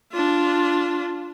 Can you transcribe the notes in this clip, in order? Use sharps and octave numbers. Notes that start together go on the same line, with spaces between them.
D4 F4